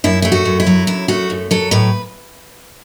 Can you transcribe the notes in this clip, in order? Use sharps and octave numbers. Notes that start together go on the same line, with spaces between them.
F#2 E4
A3 E4
F#4
F#2
E4
F#3
F#2 E4
A3 F#4
F#2
F#3 A4
A2 B4